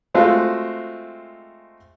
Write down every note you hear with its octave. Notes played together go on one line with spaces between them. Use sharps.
G#3 A3 C4 F4 F#4